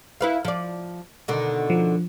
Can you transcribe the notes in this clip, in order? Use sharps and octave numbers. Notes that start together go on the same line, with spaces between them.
E4 B4 F5
F3 D5
B2 D3 D#3
F3